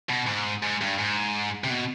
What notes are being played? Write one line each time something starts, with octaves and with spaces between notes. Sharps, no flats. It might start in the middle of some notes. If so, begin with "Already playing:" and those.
B2
G#2
G#2
G2
G#2
C3
B2